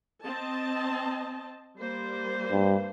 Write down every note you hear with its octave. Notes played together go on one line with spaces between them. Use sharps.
C4 D#5 A5
G3 A#3 C5
G2